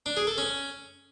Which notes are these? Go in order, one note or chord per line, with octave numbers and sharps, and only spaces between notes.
D4
G#4
A4
C#4